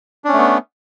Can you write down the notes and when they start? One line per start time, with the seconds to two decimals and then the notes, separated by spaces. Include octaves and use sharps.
0.24 D4
0.29 C#4
0.33 A3
0.38 B3